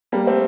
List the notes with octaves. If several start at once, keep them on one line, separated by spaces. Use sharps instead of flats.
G3 A#3
A3 C4